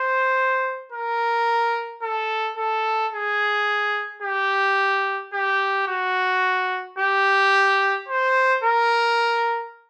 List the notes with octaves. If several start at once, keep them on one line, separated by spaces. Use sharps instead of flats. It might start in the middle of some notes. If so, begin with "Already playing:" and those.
Already playing: C5
A#4
A4
A4
G#4
G4
G4
F#4
G4
C5
A#4